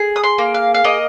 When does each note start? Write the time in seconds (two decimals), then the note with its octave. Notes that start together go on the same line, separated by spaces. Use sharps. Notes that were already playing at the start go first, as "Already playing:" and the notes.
Already playing: G#4
0.16 D#6
0.24 C6
0.38 A#3
0.54 F5
0.74 F5
0.84 A#3 D#5